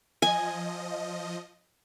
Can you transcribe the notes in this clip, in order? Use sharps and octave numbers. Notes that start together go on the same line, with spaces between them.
F3 D#5 G#5